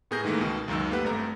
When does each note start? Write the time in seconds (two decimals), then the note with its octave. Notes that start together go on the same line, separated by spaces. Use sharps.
0.11 A2 B3 G#4 A#4 G6 A#6
0.24 G#2 D#3 E3 A3 A#3
0.39 C#2 B2 D#3
0.68 C#2 F#2 D#3 F#3 E6
0.90 A3 A#3 G4 B4 F#5
1.04 G#1 G2 A3 A#5